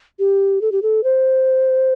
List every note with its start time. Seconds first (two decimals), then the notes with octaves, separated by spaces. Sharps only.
0.19 G4
0.62 A4
0.72 G4
0.82 A4
1.04 C5